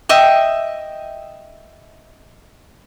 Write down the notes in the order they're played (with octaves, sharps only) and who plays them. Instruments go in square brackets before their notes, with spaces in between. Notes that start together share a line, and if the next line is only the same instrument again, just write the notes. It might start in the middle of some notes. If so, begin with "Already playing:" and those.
[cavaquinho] D#5 E5 G5